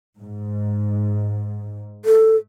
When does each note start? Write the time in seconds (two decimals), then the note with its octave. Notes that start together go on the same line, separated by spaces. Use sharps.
0.20 G#2
2.05 A4